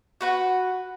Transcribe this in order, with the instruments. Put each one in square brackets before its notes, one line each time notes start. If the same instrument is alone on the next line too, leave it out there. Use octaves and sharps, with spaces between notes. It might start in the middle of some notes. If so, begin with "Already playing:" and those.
[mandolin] F#4 B4 F#5